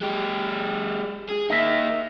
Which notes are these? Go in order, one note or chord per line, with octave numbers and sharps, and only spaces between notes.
G#3 G4
G#4
A#3 D#4 D#5 E5